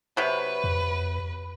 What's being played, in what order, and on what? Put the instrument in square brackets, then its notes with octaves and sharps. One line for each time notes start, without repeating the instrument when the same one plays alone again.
[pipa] C3 F#3 [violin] B4
[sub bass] F2